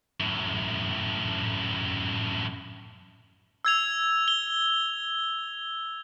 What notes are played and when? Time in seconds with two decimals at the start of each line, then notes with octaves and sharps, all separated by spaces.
0.20 F#2 A2
3.65 E6 G#6 F7
4.28 G7